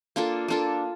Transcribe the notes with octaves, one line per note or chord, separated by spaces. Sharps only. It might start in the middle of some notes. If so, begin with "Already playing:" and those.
A#3 D4 F4 A4
A#3 D4 F4 A4